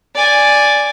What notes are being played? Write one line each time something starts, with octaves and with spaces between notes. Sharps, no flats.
D5 G#5